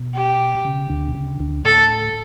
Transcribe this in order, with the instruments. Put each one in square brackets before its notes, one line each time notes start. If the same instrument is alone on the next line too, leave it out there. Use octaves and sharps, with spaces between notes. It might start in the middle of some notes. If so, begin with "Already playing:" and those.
Already playing: [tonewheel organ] B2
[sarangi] G4
[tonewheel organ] C#3
D2 D3
B2
C#3
D2 D3
[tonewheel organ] A2 [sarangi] A4